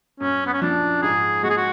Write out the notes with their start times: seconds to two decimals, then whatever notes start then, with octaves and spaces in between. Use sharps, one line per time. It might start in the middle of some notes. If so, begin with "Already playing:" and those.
0.20 F#2 C#4
0.47 B3
0.53 C#4
0.62 F3 D4
1.02 G#2 G#4
1.43 G#3 F#4
1.50 G#4
1.57 F#4